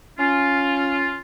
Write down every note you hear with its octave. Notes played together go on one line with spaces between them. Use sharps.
C#4 F4